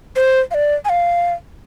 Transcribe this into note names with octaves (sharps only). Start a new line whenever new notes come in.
C5
F5
D5
G#5
F5